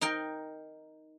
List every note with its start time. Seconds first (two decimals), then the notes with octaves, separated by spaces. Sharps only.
0.01 D#4 A#4 G5